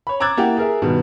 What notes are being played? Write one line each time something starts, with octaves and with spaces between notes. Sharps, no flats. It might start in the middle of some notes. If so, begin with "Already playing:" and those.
C#5 B5
A#5 D6 E6 F#6 G#6 A6
A#3 E4 G4 F#5
G#4 A#4 E5
G2 B2 D#3